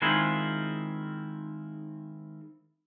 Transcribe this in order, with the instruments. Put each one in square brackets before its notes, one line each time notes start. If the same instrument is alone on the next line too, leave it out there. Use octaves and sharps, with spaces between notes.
[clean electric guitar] D#3 G#3 C4 E4 F4